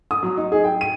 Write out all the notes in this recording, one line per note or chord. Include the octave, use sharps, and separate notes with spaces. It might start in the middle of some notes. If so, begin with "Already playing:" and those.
D#6
F#3
D#4
G#4
G5
D#7